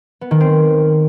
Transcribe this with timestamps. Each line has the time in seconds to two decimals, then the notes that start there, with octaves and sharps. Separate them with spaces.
0.21 B3
0.31 D#3
0.40 C4